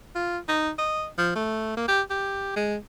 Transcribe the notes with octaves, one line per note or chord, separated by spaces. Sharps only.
F4
D#4
D#5
F3
A3
A#3
G4
G4
G#3